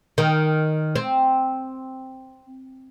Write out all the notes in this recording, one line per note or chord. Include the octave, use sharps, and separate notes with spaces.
D#3
C4